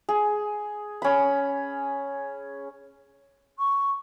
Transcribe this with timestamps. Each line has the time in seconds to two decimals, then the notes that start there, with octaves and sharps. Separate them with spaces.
0.09 G#4
1.02 C#4 B5
3.58 C#6